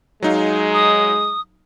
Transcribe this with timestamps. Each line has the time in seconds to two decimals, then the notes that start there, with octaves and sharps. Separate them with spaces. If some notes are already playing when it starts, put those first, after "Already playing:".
0.22 F#3 G#3 D#4 F5
0.74 D#6